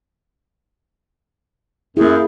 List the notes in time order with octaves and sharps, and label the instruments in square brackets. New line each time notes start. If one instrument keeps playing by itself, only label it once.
[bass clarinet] F#2 [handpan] A#3 E4 [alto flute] G#4